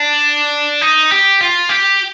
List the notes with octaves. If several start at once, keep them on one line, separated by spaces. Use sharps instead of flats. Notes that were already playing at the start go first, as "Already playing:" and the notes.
Already playing: D4
D#4
G4
F4
G4